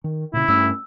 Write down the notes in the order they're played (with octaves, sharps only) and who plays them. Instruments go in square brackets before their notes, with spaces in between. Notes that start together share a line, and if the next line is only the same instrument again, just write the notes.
[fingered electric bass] D#3
[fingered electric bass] A#2 C#3 [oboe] E4
[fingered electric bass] G2 A3 C#4 [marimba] E6